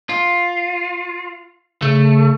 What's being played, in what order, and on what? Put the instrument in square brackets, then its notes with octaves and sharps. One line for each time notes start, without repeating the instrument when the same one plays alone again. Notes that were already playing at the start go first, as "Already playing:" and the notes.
[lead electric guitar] F4
[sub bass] C#3 [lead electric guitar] A3